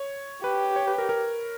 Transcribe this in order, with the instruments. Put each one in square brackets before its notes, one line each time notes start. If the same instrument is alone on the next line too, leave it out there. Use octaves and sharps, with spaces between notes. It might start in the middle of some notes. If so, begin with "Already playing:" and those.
Already playing: [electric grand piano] C#5
[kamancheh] G4 [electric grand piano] B4
[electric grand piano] C#5
B4
A#4
A#4